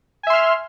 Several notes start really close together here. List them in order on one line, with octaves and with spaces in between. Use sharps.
G#5 E5 C6 F6